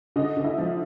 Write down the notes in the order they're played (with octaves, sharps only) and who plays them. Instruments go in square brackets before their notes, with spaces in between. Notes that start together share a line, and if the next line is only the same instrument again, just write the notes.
[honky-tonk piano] D3 D#4 D#5
D3
E4 E5
F3